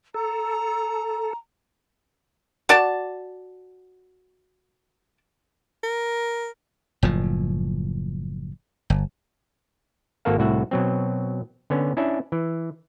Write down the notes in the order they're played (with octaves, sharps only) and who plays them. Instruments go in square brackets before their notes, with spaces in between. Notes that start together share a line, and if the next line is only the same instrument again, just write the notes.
[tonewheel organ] A4 [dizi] A#5
[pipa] F#4 D5 A5
[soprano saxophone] A#4
[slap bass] F#1 A2 F3
G1
[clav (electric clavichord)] G#1 A#3 F#4 A4 A#4 F5
C2 A2 F#4 E5 F#5
B2 F#3 C4
D3 B3 C#4
C#4 D4 E4 E5
E3